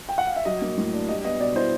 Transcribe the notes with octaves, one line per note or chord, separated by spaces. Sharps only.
G5
F#5
F5
E5
F#3 D#5
A#3
A2
D4
G3 D#5
B3 D#5
B2 D5
E4 C5